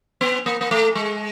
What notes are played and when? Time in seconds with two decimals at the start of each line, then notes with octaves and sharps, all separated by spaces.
0.21 B3
0.46 A#3
0.61 A#3
0.71 A3
0.95 G#3